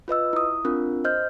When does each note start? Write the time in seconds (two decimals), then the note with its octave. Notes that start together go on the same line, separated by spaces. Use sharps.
0.08 F4 B4 D#5 E6
0.33 E4 D#6
0.65 C4 D4 F4 A#4
1.05 C5 D#5 F6 G6